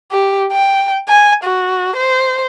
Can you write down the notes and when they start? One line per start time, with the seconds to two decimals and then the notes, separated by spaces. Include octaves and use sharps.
0.11 G4
0.52 G5
1.09 G#5
1.44 F#4
1.96 C5